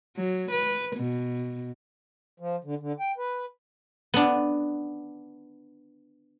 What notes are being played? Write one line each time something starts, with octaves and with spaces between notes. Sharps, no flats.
F#3
B4
B2
F3
D3
D3
G5
B4
B3 D4